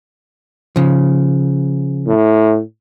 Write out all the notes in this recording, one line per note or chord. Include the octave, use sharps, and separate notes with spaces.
C#3 F3
A2